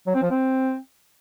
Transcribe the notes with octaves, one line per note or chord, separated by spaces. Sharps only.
F#3
C4
F3
C4